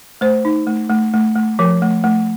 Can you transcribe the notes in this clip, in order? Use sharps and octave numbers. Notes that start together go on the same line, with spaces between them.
A3 C5
D#4
A3
A3
A3
A3
F3 A#4
A3
A3